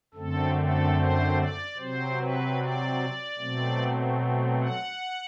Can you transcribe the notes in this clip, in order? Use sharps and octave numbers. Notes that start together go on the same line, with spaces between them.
F#2 D3 A3 C4 A4
A4
C5
D5
C3 F#3 C4 C5
B4
D5
B2 F#3 A3 C4
F#5